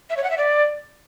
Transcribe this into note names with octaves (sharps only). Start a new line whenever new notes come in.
E5
C#5
F#5
E5
D5